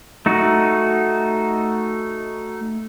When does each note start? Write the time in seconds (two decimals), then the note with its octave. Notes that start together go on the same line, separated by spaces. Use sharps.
0.26 A3 D#4 F#4